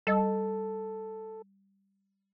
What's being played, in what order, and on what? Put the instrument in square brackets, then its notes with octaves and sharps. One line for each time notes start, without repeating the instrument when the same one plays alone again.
[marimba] G3 D#5 [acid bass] A4